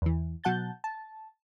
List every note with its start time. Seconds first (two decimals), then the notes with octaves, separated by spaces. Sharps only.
0.02 E2 E3
0.44 B2 F#3 F#5 A5 G6 A6
0.84 A5